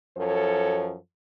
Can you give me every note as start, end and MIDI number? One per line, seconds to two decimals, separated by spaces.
0.17 0.96 42
0.17 0.96 53
0.17 0.96 69
0.17 0.96 73